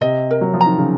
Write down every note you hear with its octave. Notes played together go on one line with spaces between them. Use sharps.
C3 D#5
A#4
F#3
F3
A#5
D#3
C#3